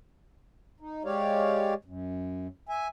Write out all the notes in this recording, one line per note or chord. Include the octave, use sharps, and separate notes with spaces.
D#4
G#3 G4 C#5 D5 F5
F#2
E5 G#5